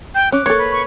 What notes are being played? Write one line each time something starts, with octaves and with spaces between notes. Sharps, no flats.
G5 G6
C#4 D6 F#6
A#3 A4 C#5
B4
C#6